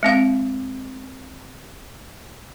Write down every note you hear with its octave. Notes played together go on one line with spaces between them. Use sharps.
G#3 C4 F5